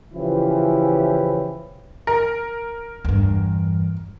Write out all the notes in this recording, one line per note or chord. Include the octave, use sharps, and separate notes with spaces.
C#3 E3 F3 C#4 E4 G4
A#4
E2 G2